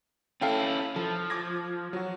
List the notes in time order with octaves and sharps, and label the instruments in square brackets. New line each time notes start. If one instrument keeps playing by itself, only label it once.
[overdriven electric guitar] C#4 E4 [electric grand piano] A4 F5 G5
[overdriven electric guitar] F3 [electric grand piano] A4
[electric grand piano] D6 G#6 A#6
F#3 F#4